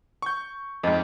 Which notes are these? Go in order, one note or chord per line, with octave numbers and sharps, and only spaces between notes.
C#6 G6
F2 G#2 A4 D#5